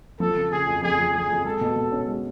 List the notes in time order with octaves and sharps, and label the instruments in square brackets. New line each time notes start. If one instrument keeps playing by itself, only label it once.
[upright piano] F3 [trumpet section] A4
[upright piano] C#3
[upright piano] C#3 [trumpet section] G#4
[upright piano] F2
[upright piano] F2 [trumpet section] G#4
[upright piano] F2
[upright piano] F2 [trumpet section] G#4
[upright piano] F2
[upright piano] G#3 [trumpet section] A4
[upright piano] B2
B2
C#4
G#3